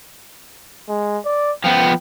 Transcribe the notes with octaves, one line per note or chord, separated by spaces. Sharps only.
G#3
D5
F3 B3 G5